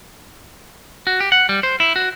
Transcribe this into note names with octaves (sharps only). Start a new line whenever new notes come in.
F#4
G4
F#5
G3
C5
E4
F#4